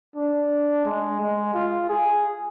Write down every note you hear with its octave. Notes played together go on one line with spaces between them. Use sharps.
D4
G#3
G#3
F4
G#4